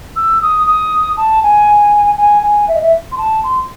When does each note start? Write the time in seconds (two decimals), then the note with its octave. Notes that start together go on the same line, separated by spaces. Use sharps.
0.16 E6
0.42 D#6
0.66 D#6
1.17 A5
1.43 G#5
2.17 G#5
2.43 G#5
2.68 E5
2.75 D#5
2.82 E5
3.12 C6
3.18 A5
3.44 C6